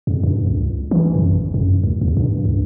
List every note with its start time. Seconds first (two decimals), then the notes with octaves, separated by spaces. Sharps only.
0.07 F2
0.23 G2
0.47 C#2
0.91 E3
1.15 F#2
1.30 G#1
1.54 F#2
1.83 D2
2.01 E2
2.17 G2
2.45 C#2